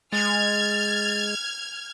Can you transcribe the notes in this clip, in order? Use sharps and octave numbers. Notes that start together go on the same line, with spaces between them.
G#3 F6 G#6 A6